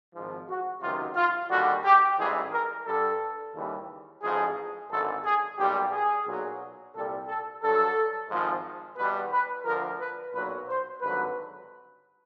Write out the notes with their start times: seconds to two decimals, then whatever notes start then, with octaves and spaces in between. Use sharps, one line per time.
0.14 G#1 G#2 F3
0.48 F#4
0.81 C#2 C3 D#3 F#3 F4
1.15 F4
1.49 D#2 D3 G3 F#4
1.84 G4
2.17 A1 G#2 E3 G3 G#4
2.51 A#4
2.85 G2 D3 G3 A4
3.53 D#2 C#3 E3 G3
4.21 A1 G#2 F3 G#4
4.90 G#1 F#2 D3 A4
5.24 G#4
5.57 B1 A#2 G3 G4
5.92 G#4
6.26 B1 A#2 F#3
6.94 C2 A#2 G3 A4
7.27 A4
7.61 G2 D3 F#3 A4
8.29 G#1 G#2 F3
8.97 E2 B2 G3 B4
9.31 B4
9.65 D2 D3 F3 A#4
10.00 B4
10.33 B1 A#2 F#3 B4
10.68 C5
11.01 G#1 G2 D3 F#3 B4